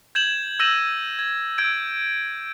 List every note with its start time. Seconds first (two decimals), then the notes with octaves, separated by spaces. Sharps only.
0.15 G6 G#6 E7 F#7
0.60 E6 G6 A#6 D#7 E7 F#7
1.19 G#6
1.58 E6 G6 G#6 D7